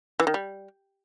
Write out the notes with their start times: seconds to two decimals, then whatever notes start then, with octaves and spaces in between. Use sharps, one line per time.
0.20 E3
0.27 D#3
0.34 G3